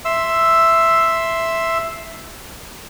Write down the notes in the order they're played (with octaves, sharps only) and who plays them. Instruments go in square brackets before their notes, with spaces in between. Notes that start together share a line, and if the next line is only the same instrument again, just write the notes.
[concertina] E5 C6 E6